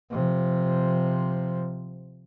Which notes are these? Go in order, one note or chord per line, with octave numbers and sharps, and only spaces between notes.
C3 F3